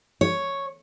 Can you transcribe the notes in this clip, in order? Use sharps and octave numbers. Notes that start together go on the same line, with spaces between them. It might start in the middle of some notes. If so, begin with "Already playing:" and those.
C#5